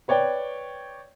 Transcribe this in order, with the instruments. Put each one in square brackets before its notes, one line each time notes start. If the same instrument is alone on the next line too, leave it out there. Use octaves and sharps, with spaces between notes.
[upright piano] B4 C#5 D5 G5